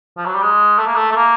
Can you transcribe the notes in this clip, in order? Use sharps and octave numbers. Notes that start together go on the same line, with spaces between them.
F3
F#3
G3
G#3
A3
A#3
A3
A3
A#3